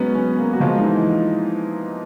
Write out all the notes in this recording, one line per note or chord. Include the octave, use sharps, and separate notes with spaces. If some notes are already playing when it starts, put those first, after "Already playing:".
Already playing: F#3 G#3 B3 C#4 B4
C#4
A#3
F#4
F3 G#3 F4
D#4
E3